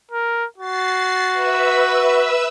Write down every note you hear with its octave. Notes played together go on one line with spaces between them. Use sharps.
A#4
F#4 A6 C7
B4 E5 E6